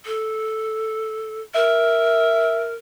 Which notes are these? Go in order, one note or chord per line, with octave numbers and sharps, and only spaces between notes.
A4
A#4 E5